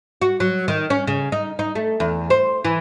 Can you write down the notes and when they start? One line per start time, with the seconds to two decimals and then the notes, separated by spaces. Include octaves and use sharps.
0.22 F#4
0.40 F#3
0.68 D#3
0.90 C#4
1.07 C#3
1.32 D#4
1.59 D#4
1.75 A3
2.00 E2
2.30 C5
2.65 E3